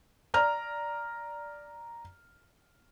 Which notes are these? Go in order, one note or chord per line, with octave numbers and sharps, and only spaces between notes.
D5 A#5 F6